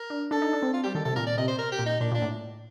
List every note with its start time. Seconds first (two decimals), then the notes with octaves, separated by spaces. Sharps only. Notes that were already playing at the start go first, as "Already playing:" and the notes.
Already playing: A#4
0.10 D4
0.31 D4 A4
0.42 D#4
0.53 D4
0.63 C4
0.74 F4
0.84 G3 G4
0.95 D#3 A4
1.05 C3 A4
1.16 A#2 A#4
1.27 D5
1.38 C3 D#5
1.48 C5
1.59 A#4
1.72 G4
1.79 A#2
1.86 D#4
2.01 A#2 D4
2.12 A#2
2.15 D4
2.22 A2